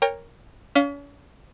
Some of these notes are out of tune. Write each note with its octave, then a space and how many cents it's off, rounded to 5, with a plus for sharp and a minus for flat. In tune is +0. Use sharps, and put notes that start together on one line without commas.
A#4 +0 C#5 +0 G5 +30
C#4 +40 F5 +0